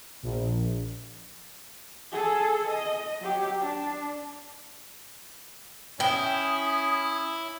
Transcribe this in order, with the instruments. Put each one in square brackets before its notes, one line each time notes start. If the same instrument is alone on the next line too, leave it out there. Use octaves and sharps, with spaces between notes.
[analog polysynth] A#1
[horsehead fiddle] G#4 A4
D#5
F#3 G4
D4
[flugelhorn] C#4 [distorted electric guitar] E4 [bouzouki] G5 [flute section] D#6